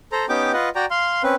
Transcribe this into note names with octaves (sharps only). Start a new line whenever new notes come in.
A4 C5 A#5
B3 C#4 D#4 G4 G5 D6
F4 B4 D#5 F#5
F#4 D5 G5 A#5
F5 C6
C4 C#4 B4